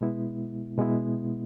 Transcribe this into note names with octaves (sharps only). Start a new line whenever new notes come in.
B2 G#3 B3 E4
B2 G#3 B3 E4